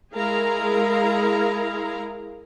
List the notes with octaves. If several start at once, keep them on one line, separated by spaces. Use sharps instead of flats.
G#3 E4 G#4 A#4 F5 A#5